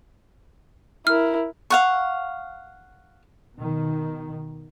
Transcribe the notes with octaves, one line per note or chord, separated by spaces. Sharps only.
E4 A#4 F6
F5 F#5 C#6
B2 D#3